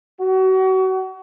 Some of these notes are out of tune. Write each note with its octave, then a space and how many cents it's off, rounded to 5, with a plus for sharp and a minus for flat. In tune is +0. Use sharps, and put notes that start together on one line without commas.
F#4 +35